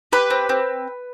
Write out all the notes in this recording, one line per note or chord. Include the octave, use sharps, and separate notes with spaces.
G4 B4
C4
C4